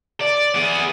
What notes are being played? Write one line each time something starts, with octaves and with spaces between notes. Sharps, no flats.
D5
B3 G#4